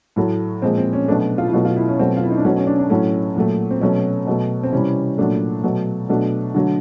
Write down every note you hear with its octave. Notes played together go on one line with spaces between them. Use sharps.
A2 F#3 A3
A#2 F3 G#3 C4
C4
C#4
B2 F#3 A3 D4
F4
E4
B2 F#3 A3 F4
F4
E4
C#4
B2 F#3 A3 C4
F4
E4
D#4
D4
B2 F#3 A3 C#4
C#4
D4
D4
A2 F#3 A3 C#4
A#2 F#3 A3
C4
B2 F#3 A3 C#4
B2 F#3 A3
C4
C3 E3 G3 C#4
A#2 F#3 A3 D4
B2 F#3 A3
B2 F#3 A3 D4
D3 F#3 A3